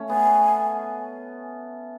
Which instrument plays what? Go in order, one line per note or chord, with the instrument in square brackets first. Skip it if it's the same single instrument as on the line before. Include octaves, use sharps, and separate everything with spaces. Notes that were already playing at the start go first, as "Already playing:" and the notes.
Already playing: [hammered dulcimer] A3 C#4
[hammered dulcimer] B3 [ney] G#5